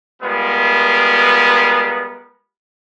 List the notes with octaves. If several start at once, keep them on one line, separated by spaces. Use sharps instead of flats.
G3 G#3 B3 F4 A#4